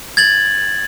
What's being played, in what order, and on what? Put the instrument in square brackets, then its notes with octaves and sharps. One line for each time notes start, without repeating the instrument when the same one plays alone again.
[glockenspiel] G#6 A6 F#7